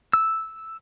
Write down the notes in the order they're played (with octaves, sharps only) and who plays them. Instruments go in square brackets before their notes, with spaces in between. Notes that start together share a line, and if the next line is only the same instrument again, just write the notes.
[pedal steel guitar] E6